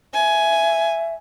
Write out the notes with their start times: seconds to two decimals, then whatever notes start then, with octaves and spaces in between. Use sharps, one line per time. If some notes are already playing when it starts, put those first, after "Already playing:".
0.14 E5 G#5